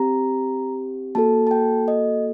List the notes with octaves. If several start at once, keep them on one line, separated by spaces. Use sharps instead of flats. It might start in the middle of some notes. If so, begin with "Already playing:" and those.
Already playing: C4 G4 A#5
A#3 F#4 A4 A5
A5
G5
D#5